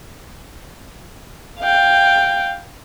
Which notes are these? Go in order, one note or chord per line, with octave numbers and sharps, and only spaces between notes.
F5 G5